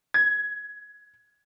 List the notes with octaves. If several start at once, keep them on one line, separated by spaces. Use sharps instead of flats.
G#6